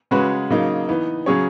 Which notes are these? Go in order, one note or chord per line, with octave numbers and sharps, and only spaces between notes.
C#3 G#3 C#4 F#4 B4
C#3 F#3 A#3 D#4
E3 B3 D#4
C#3 F#3 C#4 G#4 C#5